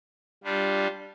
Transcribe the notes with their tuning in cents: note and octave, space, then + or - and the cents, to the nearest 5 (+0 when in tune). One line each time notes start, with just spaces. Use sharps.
G3 +0 D4 +0 F4 +0